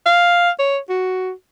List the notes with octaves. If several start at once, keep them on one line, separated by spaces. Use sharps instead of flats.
F5
C#5
F#4